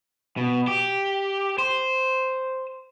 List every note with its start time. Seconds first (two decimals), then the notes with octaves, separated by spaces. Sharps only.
0.37 B2
0.67 G4
1.58 C5